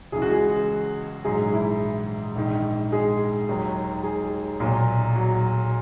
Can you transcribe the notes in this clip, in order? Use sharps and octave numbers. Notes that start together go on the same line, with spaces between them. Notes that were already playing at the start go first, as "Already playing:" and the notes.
C#2 C#3 E3 G#4
F#4
G#3 G#4
A#1 G#2 F#3 G#3 G#4
E3 E4
A#1 G#2 D#3
G#3 G#4
D#2 D#3 F#3
G#3 G#4
B1 A#2 F#3
F#3 F#4